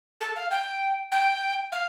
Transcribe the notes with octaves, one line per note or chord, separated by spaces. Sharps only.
A4
F5
G5
G5
F5